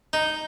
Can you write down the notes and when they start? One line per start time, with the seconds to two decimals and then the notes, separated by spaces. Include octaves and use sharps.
0.13 D#4